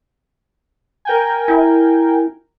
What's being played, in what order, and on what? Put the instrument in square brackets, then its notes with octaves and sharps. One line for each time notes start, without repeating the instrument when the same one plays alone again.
[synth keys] A#4 G5 G#5
[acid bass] E4